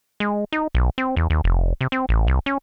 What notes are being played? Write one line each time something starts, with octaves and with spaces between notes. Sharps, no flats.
G#3
D#4
B1
C4
E2
D#2
F1
C3
C4
A1
C2
C#4